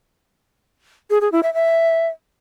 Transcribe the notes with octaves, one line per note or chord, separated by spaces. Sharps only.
G#4
G#4
E4
E5
E5